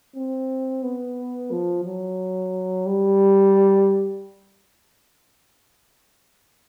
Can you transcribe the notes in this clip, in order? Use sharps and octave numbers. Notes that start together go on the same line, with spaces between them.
C4
B3
F3
F#3
G3